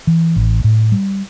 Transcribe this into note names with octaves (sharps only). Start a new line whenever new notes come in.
E3
A1
A2
G3